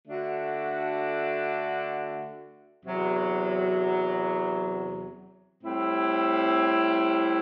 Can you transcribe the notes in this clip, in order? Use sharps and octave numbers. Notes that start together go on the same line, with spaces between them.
D3 A3 D4 F#4
E2 C3 F#3
A2 G3 C4 E4